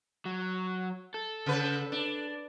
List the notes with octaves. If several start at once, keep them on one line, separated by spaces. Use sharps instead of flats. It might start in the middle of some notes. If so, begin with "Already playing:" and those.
F#3
A4
C#3 B4
D4